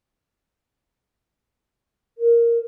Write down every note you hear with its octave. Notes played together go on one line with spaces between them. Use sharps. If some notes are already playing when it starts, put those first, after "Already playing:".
A#4